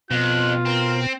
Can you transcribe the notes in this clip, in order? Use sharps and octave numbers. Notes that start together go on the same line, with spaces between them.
F2 B2 F4 F#6
C4 A#4